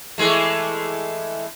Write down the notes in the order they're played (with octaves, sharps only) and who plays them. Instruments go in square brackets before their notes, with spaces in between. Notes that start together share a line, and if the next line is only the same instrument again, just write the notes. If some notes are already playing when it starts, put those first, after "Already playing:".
[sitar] E3 G#3 A3